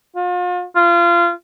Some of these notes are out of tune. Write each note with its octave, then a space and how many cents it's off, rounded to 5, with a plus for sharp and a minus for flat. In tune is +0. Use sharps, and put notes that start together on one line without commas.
F4 +40
F4 -25